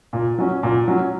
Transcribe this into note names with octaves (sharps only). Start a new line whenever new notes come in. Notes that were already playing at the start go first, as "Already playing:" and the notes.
A#2
F#3 C#4
A#2
F#3 C#4